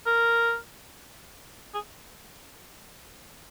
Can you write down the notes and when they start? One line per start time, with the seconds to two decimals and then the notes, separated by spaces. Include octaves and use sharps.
0.06 A#4
1.74 G#4